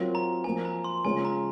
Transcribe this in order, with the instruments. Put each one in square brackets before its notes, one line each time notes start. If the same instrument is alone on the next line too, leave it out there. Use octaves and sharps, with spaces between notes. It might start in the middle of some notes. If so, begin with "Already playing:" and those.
Already playing: [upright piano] F#3 C4 F4 A#4 C#5
[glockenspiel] A#5
[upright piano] F3 A#3 F4 C5 [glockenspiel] G#5
[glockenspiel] A#5
C6
[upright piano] C#3 G#3 C#4 F4 [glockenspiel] G#5
[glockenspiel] A#5